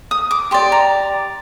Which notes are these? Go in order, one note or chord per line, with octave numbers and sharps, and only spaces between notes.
D#6
D6
G4 D5 C6
A#5